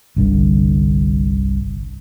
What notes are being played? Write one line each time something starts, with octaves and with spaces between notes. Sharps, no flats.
G1 C2 D3